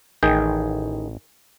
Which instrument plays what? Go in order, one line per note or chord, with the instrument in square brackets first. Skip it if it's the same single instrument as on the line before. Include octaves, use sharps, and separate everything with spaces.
[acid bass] A1 [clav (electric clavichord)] D#3 G#4 G5